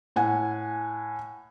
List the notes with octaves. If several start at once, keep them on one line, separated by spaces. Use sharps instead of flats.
A2 F#5 G#5